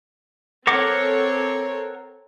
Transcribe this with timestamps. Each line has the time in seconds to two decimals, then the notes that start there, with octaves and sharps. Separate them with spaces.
0.67 C4 A4 A#4 C#5 F#5 D6